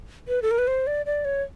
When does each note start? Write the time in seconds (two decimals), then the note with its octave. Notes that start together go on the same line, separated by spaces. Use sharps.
0.28 B4
0.42 A4
0.51 A#4
0.58 B4
0.67 C5
0.87 D5
1.06 D5
1.25 C#5